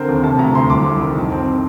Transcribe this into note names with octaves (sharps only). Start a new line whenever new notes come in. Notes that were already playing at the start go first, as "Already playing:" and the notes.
Already playing: D3 C4 A#4 C5
D#2
C3 A5
D2 A#5
D2 C6
C2 D6
C2
D#3
F2
C4